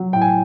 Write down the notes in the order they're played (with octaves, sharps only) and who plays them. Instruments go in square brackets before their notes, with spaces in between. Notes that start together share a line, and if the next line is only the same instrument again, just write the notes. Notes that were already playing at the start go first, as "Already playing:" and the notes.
Already playing: [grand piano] F#3
A2 G5
G#5